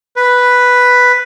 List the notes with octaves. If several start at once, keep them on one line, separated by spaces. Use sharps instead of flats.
B4